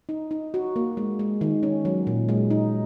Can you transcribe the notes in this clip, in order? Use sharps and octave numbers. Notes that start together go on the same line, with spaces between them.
D#4
D#4
F#4
A#3
G#3
G#3
D#3
C#4
F#3
A#2
G#3
D#4